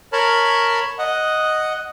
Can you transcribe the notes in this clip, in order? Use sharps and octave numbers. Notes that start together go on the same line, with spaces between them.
A#4 C#5 A5 B5 F6
D#5 F#5